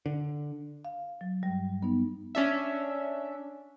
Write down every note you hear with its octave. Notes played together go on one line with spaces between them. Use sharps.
D3
F5
F#3
G2 G3
B3 D#4
C#4 D4 E5